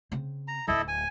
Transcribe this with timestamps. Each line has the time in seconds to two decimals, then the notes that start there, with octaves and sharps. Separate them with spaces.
0.12 C#3 C4
0.48 A#5
0.68 D1 D2 E4 A4 D#5
0.88 G#5